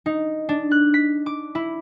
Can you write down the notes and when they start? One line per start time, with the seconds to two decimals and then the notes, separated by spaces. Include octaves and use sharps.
0.06 D#4
0.49 D4
0.71 F#6
0.94 B6
1.26 D6
1.55 E4